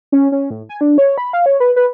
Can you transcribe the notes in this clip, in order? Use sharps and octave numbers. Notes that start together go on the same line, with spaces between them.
C#4
C#4
A2
G#5
D4
C#5
B5
F5
C#5
B4
B4